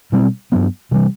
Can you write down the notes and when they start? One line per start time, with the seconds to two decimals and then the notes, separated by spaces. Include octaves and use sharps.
0.12 B2 G3 C4
0.52 G2 F#3 B3
0.91 C3 E3 G3